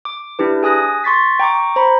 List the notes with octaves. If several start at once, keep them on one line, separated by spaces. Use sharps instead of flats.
D6
D4 E4 G4 B4
G#4 G#5 D#6 F#6 A#6
C6 C#6 A6 B6
G5 A#5 C#6 D6
C5 A#5 B5